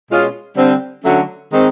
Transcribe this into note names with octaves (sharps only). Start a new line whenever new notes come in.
B2 G#3 C#4 F4 G#4
D3 G3 C4
D3 F#3 A3 C#4 F#4
D#3 G#3 C4 D#4